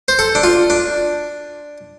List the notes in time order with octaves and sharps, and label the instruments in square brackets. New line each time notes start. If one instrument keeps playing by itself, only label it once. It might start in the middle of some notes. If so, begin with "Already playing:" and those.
[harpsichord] C5
A4
D4
F4
D4